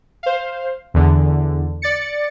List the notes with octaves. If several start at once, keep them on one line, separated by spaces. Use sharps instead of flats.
C5 F5
E2 D3
D5 A6 C#7